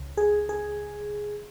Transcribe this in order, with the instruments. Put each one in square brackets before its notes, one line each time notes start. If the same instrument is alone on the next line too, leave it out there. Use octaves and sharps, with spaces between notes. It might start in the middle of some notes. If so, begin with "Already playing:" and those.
Already playing: [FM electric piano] C#2 C#3
G#4
G#4